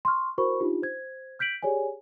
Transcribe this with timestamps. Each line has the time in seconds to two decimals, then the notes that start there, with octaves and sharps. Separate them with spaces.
0.05 C6 C#6 F6
0.38 E4 F#4 A#4 C5 B5 C#6
0.60 D4 D#4 F4 G4
0.82 C5 G#6
1.39 F6 G6 B6 D7 F#7
1.63 G4 G#4 C#5 D5 G#5